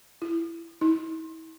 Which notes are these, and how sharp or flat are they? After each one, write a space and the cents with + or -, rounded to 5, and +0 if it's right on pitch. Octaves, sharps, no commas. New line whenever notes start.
E4 +20
E4 -35